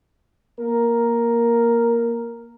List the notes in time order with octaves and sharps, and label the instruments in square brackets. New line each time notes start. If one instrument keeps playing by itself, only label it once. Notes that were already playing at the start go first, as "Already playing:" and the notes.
[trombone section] A#3 A#4